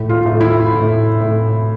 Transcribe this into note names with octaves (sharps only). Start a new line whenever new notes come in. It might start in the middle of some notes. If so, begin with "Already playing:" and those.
Already playing: A2
F4
A2
E4
A2
A2